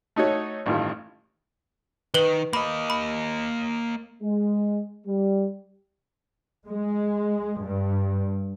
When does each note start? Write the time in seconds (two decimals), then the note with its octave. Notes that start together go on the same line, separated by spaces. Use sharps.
0.16 A3 D#4 F#4 C#5
0.66 A1 G2 D#3 A3 F4
2.14 D#3 B4 F#7
2.53 A#3 D#5 B5
2.90 B5
4.23 G#3
5.07 G3
6.67 G#3
7.60 G2